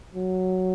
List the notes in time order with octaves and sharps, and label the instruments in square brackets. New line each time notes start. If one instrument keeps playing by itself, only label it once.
[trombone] F#3